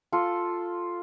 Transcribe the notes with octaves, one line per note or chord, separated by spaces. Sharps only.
F4 A4